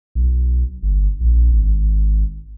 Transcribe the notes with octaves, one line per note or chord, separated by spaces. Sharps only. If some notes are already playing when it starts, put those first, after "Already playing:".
B1
G1
A#1
G#1